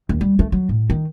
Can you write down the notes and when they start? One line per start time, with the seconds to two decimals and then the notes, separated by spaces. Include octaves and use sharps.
0.09 D#2
0.21 G3
0.39 A3
0.52 F#3
0.69 A2
0.90 D#3